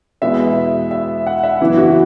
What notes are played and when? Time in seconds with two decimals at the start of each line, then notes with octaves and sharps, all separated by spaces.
0.22 E2 B2 G#3 B3 E5
0.91 E5
1.27 F#5
1.43 E5
1.61 F#2 C#3 E3 B3 E4
1.77 F#4